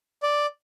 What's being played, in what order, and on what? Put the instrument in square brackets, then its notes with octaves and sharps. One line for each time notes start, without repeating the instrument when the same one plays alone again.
[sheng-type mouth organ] D5